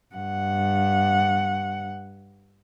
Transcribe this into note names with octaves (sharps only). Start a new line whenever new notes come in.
G2 F#5